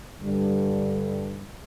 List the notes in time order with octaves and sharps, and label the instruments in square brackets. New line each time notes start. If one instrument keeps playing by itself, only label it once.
[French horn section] G2 D3 G3